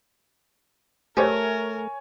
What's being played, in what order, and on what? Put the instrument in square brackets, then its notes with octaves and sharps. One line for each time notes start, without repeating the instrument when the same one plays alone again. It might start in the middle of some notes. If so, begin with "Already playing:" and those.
[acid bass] A3 [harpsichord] G4 C5 [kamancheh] A#4 [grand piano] C#5 G#5